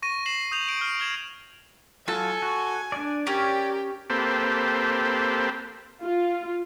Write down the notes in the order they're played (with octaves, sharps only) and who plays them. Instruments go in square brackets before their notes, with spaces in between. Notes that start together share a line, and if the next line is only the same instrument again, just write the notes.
[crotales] C#6 A#6 D#7
A#6 C7 E7 F#7
D#6 G6 F7
D7 F#7
F6 D7
F6 G#6 E7
[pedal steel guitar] F#3 F4 A5 [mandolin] A4 [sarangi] G#5
[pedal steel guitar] F#4
D4 D5
[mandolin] C#4 [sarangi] G4 [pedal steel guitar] A#4 C#5 D5
[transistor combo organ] A#3 C4 G4 A4 B4 C5
[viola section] F4